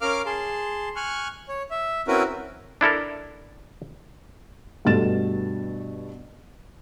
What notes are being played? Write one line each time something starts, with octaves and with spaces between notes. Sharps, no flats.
C#4 A#4 F5 D6 F6
G#4 A5 C6
G#5 C#6 F6 F#6
C#5
E5
C4 C#4 E4 F#4 A#4 B4
D4 E4 A4 A#4
G2 B2 A3 A6 E7